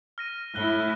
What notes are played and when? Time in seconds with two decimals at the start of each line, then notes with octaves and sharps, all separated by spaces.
0.18 F6 A#6 D#7
0.55 A2 E4 F#6 G7